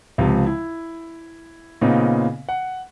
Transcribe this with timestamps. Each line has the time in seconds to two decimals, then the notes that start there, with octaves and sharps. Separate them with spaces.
0.18 C#2 C3 F3
0.46 E4
1.82 A#2 C#3 B3 C4 D#4
2.49 F#5